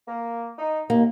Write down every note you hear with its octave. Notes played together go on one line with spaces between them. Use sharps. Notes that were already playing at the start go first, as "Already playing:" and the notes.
A#3
D#4
D#2 A#3